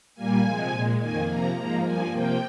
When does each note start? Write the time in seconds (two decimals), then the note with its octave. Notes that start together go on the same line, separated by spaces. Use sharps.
0.15 A#2 G3 A#3 G#5
0.43 C3 F3 G#3
0.71 A#2 G#3
0.99 F2 D#3 A#3 G#5
1.27 C3 F3 A#3 A#5
1.55 G#2 F3 A#3 A#5
1.83 G2 F3 A#3 G#5
2.11 C3 F3 A#3 G5